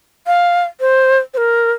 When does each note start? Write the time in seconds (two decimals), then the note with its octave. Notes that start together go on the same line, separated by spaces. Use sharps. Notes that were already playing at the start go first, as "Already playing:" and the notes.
0.27 F5
0.81 C5
1.34 C5
1.37 A#4